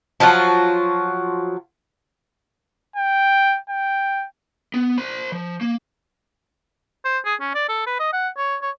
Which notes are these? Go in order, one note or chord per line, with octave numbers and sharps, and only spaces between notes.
F3 F#3 F4 F#4
G5
G5
B3
C5 B5
F3
A#3
C5
G#4
C#4
D5
A4
B4
D#5
F#5
C#5
C#5